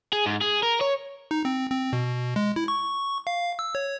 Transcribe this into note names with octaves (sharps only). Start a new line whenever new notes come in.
G#4
G#2
G#4
A#4
C#5
D#4
C4
C4
B2
G#3
E4
C#6
F5
E6
C#5